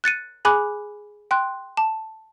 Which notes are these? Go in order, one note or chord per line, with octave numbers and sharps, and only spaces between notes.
F#6 A6 C#7 D#7
G#4 G#5 B5 D6 F#6
G5 C6 F#6
A5